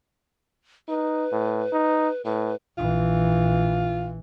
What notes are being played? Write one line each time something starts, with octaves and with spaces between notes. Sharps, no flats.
D#4 B4
A2
D#4
A2 B4
A#1 E3 F4